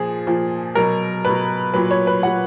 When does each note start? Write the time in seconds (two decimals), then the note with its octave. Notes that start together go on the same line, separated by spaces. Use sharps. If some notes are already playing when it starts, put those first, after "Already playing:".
Already playing: A#2 F3 G#4
0.27 A#2 F3
0.75 B2 F#3 A#4
1.25 B2 F#3 B4
1.74 A#2 F#3 B4
1.91 C#5
2.07 B4
2.23 A#2 F#3 F#5